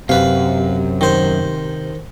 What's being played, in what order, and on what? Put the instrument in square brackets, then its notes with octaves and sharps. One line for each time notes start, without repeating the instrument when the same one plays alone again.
[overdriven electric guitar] F#2 [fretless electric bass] C3 [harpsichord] B4 F5
[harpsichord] D#3 C5